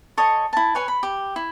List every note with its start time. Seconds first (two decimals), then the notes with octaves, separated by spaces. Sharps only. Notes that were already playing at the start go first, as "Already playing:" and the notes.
0.17 A4 C#5 D#5 G#5
0.53 E4 A5
0.75 B4 C#5 G#5
0.88 B5
1.03 G4
1.36 E4